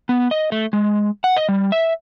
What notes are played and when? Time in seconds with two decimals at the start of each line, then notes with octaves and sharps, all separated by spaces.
0.09 B3
0.31 D#5
0.52 A3
0.73 G#3
1.24 F#5
1.37 D#5
1.49 G3
1.72 E5